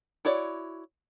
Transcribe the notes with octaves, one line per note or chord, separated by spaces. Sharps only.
E4 F#4 C#5 D5